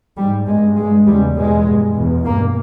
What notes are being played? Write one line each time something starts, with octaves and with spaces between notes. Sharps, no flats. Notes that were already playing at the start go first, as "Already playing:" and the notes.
G#2 G3
G2 G#3
G2 G#3
E2 C#3 G3
E2 B2 G#3
G2
E2 B2
G2 A#3